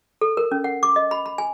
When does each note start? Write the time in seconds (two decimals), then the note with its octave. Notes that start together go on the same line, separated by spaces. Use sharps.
0.21 A4
0.37 A#4
0.52 C#4
0.64 F#5
0.83 D6
0.96 D#5
1.11 B5
1.26 B5
1.38 G#5